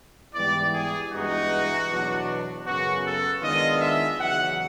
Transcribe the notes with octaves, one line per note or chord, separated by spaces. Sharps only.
G#2 E3 G3 B3 E4 D5
G#4
G2 E3 G#3 B3 D#4 F#4
E2 B2 F#3 B3 D4
F#2 C#3 F#3 B3 F#4
A4
D#3 G#3 B3 D4 F4 D#5
E5
E2 C#3 F#3 F#5